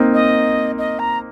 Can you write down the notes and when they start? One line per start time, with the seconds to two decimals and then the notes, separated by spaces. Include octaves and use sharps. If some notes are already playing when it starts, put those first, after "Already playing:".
Already playing: A#3 C4 D#4
0.14 D#5
0.78 D#5
0.99 A#5